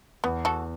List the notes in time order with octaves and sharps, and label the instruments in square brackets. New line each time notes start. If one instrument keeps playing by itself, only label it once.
[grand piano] E2 [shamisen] B3
[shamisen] F#4 A4